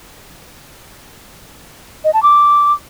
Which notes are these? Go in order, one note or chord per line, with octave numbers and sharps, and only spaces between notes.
D#5
A5
D6